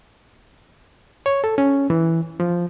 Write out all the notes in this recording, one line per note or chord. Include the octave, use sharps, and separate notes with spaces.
C#5
A4
C#4
E3
F3